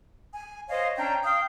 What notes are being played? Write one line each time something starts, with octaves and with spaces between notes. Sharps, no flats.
G#5
C5 C#5 D#5 F5
C#4 D4 G5 A#5
F5 G5 D#6